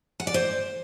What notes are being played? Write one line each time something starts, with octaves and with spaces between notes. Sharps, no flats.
F#5
D5
C5